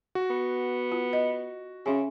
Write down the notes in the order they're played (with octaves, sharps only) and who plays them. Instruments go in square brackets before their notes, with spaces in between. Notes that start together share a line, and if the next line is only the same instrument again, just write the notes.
[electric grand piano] F#4
[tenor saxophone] B3
[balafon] F4
D#5
[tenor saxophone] C#3 [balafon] C#4 E5 G#5